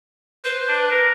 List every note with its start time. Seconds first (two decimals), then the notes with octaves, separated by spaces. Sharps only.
0.45 B4 C5
0.68 D4
0.91 A#4